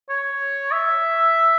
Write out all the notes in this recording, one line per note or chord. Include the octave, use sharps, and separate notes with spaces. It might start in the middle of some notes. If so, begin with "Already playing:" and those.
C#5
E5